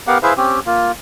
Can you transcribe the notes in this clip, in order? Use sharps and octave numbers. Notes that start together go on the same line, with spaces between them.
B3 G4 A#4 F5 F#5
E4 G#4 B4 C5 E5 F5
C4 C#4 G4
A#3 F4